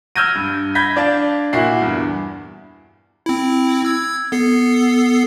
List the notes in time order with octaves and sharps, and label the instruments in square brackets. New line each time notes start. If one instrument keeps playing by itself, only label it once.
[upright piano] E6 F6 G6 G#6 A#6 D#7
G2
B5 G6 G#6 A#6 B6
D4 D5 F5 A5 A6
A#2 E4 F#4 C7
E2 G2
[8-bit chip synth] C4 E4
E6 G#6
B3 A4 C7